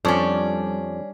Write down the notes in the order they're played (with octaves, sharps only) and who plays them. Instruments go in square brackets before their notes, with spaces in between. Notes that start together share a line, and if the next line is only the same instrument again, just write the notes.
[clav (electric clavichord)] F2 C#5 D5 [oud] G3 [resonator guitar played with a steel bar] C#4 D4